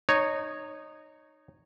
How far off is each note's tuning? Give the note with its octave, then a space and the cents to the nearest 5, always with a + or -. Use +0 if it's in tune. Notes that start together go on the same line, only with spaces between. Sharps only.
D#4 -15 C#5 +0